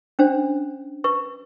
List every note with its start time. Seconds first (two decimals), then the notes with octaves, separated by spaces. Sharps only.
0.19 C#4 D4 C5
1.04 B4 C#6